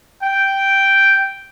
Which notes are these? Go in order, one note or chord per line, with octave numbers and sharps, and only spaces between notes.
G5